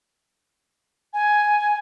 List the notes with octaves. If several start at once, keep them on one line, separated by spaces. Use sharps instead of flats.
G#5